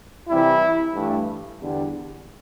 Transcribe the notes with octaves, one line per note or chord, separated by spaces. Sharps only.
C3 E3 G3 E4
G2 E3 A3
E2 D3 G3